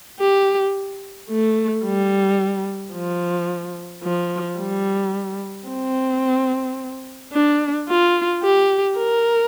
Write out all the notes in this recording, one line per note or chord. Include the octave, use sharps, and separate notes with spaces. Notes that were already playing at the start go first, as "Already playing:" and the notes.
G4
A3
G3
F3
F3
G3
C4
D4
F4
G4
A#4